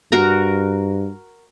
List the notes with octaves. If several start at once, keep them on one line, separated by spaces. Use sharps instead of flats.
G2 F#4 A#4 A#5